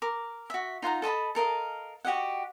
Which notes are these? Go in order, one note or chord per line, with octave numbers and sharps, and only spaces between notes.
A#4 D6
F#4 E5
D#4 F4 F#5 A#5
A4 D#5 A5 B5
A4 A#4 D#5 F5
F#4 G4 D#5 F#5